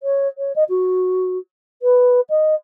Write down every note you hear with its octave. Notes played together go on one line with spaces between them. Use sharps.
C#5
C#5
D#5
F#4
B4
D#5